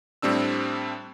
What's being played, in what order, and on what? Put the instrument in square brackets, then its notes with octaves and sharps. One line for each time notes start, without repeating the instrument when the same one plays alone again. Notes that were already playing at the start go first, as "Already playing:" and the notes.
[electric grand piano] A2 G3 C4 D4 E6